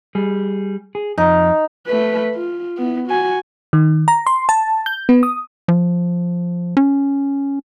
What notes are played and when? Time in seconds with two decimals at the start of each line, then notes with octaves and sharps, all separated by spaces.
0.15 G3 G#4
0.95 G#4
1.18 F2 D#4
1.87 A3 B4
2.35 F4
2.78 B3 E4
3.08 F#4 G#5
3.73 D#3
4.08 A#5
4.27 C6
4.49 A5
4.86 G6
5.09 B3
5.23 D#6
5.68 F3
6.77 C#4